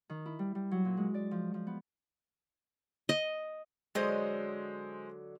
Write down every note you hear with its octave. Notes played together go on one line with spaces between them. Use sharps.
D#3
E4
G3
G3
F#3
A#2
G#3
D5
F3
F3
B3
D#5
D3 F#3 G#3 C5 D#5